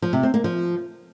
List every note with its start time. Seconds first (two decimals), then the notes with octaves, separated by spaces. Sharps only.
0.02 F3
0.13 C3
0.23 C4
0.34 A#3
0.44 F3